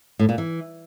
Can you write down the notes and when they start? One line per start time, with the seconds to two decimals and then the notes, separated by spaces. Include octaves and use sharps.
0.19 A2
0.29 A#2
0.38 E3